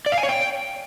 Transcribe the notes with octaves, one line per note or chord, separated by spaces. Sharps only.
D5
F5
G#5
C#5
G5